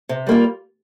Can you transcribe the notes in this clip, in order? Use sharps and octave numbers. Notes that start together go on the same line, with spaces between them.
C3
G3 A#3 F4